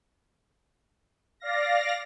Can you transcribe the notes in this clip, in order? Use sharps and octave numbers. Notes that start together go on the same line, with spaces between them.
D5 F5 A#6